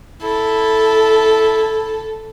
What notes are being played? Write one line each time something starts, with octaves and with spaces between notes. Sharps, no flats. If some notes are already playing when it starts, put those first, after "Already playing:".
E4 A4